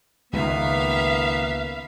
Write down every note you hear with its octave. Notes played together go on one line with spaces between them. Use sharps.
C#2 D#3 A#3 B3 B4 E5 F5